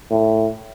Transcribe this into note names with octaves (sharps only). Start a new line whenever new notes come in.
A2